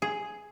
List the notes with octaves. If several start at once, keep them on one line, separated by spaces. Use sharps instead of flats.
G#4